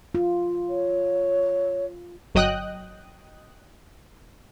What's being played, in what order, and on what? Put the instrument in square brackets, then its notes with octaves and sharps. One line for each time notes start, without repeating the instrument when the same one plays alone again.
[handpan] F4
[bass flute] C#5
[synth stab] G1 F#3 D#5 G5 D#6 F#6